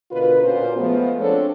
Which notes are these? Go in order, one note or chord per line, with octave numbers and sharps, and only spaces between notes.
B2 D3 F4 A#4 B4
A#2 A#3 C#4 F4 F#4 C5
F3 G#3 A3 B3
C4 D4 A4 C#5